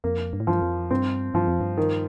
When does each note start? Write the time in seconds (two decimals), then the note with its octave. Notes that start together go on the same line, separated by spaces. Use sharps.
0.04 F2 A#3
0.33 G2
0.40 A2
0.47 G2 F3
0.62 F2
0.91 G2 C4
1.34 G2 F3
1.47 F2
1.61 G2
1.77 D#3